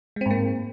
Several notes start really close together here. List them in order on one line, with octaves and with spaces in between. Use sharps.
G#3 C4 G#2 A#3